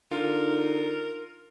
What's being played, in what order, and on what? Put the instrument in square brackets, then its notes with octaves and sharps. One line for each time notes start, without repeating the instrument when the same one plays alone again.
[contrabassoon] D3 [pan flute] D#4 [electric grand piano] F4 [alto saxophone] A#4